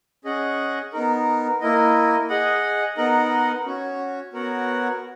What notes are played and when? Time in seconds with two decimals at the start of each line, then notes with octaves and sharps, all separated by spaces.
0.25 C#4 G#4 D#5 F#5
0.93 B3 D#4 A#4
1.61 A#3 E4 A#4 D#5
2.29 G#4 D#5 F#5
2.97 B3 D#4 A#4 D#5 F#5
3.65 C#4 F#4 C#5
4.33 B3 F#4 A#4 C#5 F#5